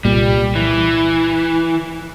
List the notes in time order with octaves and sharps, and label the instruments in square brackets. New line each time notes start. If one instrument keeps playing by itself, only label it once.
[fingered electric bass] C2 A#2 [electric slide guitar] G3
[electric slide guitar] E3